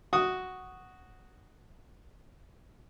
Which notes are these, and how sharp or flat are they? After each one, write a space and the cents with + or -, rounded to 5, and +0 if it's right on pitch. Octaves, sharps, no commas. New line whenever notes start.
F#4 +0 D#6 +0